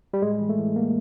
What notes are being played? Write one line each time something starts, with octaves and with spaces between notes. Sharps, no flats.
G3
A2 G#3
E3
A3
E3
E3 A#3